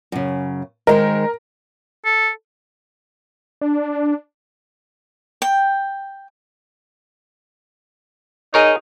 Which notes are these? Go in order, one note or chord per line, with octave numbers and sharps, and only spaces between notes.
F#2 C#3
D#3 G#3 A#4 C5
A4
D4
G5
D#4 G#4 A#4 C#5